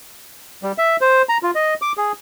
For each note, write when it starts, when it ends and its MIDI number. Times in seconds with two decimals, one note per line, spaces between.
0.63 0.72 55
0.78 0.96 76
1.01 1.22 72
1.29 1.38 82
1.43 1.51 65
1.55 1.74 75
1.82 1.92 86
1.97 2.12 68